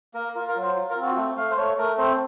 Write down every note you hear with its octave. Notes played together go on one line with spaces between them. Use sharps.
A#3 A#4
F4 A#4
A#4
F#3
C5
F4
A#4
C4
F#4
A3 A4
A3 F5
C5
A3 C#5
A3 A#4
C4 C5